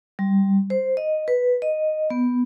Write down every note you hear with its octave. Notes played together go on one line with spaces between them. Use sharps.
G3
C5
D#5
B4
D#5
B3